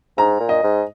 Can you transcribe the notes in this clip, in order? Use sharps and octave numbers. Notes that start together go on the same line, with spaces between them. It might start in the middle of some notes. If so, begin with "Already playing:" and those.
G#2 A#5
A#2
D#5
G#2